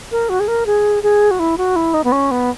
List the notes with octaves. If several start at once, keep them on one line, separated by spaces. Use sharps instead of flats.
A#4
F#4
G#4
A#4
G#4
G#4
F#4
E4
F#4
E4
D#4
B3
C#4
B3